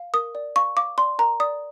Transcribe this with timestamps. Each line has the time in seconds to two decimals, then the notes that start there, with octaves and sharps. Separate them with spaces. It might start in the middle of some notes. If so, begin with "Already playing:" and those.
Already playing: F5
0.14 A#4 D#6
0.35 D5
0.56 F5 C#6
0.77 F5 D6
0.98 D5 C6
1.19 A#4 A#5
1.40 D5 D#6